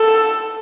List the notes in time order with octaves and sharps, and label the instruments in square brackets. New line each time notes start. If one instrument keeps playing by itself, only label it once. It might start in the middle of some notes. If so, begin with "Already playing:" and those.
Already playing: [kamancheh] A4